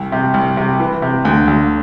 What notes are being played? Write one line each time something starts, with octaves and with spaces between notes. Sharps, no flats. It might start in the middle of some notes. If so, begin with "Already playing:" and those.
Already playing: C2
C3
C2
C3
E3
C3
D2
D2